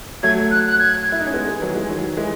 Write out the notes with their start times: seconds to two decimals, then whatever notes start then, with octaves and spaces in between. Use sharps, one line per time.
0.23 F#3 A3 G#6
0.51 F#6
0.67 F#6
0.79 G#6
1.12 E4
1.20 D#4
1.26 C#4
1.34 G#3 B3
1.48 E3 G#3
1.62 D#3 F#3
1.75 E3 G#3
1.90 D#3 F#3
2.17 E3 G#3